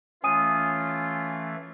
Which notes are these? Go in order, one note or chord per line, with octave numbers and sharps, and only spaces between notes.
E3 A3 C#4 F4 G#5 D#6 D#7